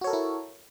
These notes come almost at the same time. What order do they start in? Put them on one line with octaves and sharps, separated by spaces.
F#4 C#5 A4 A#4 E4